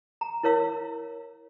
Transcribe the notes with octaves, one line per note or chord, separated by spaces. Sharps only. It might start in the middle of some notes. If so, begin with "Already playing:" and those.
A#5
E4 A#4 C#5 F5 E6